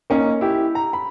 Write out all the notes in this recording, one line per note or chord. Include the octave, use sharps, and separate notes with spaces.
A#3 C#4 D#4
E4 G4
A#5
B5